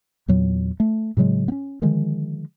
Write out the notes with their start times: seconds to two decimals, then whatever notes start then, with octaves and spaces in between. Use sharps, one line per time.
0.28 E2 A#2 F#3
0.80 A3
1.17 A2 C#3 F#3 G#3
1.48 B3 C#4
1.82 D3 D#3 F3 G#3